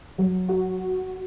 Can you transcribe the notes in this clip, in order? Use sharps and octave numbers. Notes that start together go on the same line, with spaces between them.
F#3
F#4